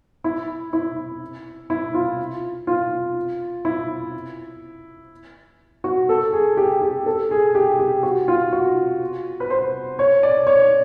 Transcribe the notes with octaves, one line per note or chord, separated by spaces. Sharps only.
E4
E4
E4
F4
F4
E4
F#4
A4
G#4
G4
G4
A4
G#4
G4
G4
F#4
F4
F#4
B4
C5
C#5
D5
C#5